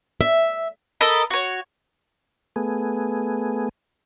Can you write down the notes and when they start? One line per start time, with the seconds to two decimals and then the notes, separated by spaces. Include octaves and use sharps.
0.21 E5
1.01 A4 A#4 D#5 B5
1.30 F#4 C#5
2.56 A3 B3 G#4